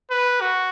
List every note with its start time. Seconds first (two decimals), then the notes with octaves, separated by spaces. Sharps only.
0.11 B4
0.41 F#4